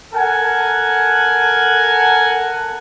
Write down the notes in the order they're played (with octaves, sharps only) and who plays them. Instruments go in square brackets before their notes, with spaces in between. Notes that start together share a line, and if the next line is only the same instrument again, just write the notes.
[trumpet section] A4 A#4 F#5 G#5